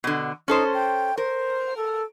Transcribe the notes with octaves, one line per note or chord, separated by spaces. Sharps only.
B2 D3
C#4 D#4 A4 C5
G5
A#4 C5
A4